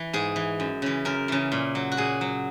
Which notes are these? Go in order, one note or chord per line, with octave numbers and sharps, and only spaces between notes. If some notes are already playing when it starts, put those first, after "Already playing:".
Already playing: E3
G#2 G#4
E3
F#2
C#3 E3
F#2 A#4
C#3 E3
A#2
F#3
F#4
A#2 G#4
F#3